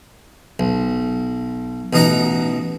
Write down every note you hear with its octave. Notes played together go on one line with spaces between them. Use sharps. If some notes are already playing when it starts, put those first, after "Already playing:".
B1
A1 B2 D#4 D#5 F#5 A#5